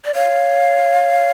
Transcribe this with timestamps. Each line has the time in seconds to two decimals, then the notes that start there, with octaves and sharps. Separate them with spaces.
0.05 D5
0.15 C#5 F5